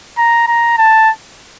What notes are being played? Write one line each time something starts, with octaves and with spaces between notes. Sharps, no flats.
A#5
A#5
A5